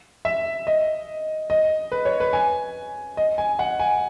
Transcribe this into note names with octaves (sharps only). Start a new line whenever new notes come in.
E5
D#5
D#5
B4
C#5
B4
G#5
D#5
G#5
F#5
G#5